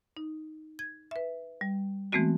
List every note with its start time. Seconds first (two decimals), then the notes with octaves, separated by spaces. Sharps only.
0.17 D#4
0.79 G#6
1.11 B4 E5
1.61 G3
2.12 E3 G#3 A3 B3 C4 F#4